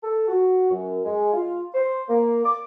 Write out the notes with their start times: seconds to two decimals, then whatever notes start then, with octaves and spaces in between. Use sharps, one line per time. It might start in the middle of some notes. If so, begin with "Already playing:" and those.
0.03 A4
0.28 F#4
0.70 F#2
1.05 G#3
1.33 F4
1.74 C5
2.09 A#3
2.45 D6